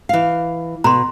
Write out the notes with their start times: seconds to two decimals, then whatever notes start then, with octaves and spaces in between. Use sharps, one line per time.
0.09 E3 F5
0.84 B2 A#5 C6